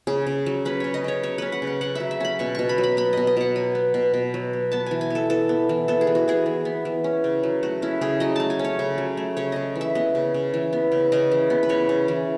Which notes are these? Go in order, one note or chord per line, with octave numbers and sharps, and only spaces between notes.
C#3 G#4
C#3
F#3
C#4 B4
C#3 C#5
D#5
C#3 C#5
F#3 C#5
C#4 B4
F#5
C#3
F#5
C#3 F#5
F#3 E5
E5
C#4 B5
B2 C#6
B2 C#6
B5
F#3
B5
B3 B5
B2 D#5
D#5
B2 F#5
F#3 G#5
B3
B2
B2
F#3
B3
B3 A5
E3 G#5
G#5
B3 A4
E3 A4
B3
E3
B3 A4
G#4
E3
F#4
B3 G#4
E3
B3
E3
C#4
C#3
F#3
A3 F#4
C#4 E4
C#3 G#4
F#3 D#5
A3 A5
G#5
C#4
C#5
C#3
F#3
A3
C#3 C#5
C#3 D#5
E3
E5
B3 D#5
C#3
C#3
E3
B3
C#3
C#3 D#5
E3
B3
B4
C#3 C#5
C#3
E3